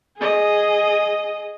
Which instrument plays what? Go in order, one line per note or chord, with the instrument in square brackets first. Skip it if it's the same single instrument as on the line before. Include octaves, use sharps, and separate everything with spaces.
[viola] G#4 D#5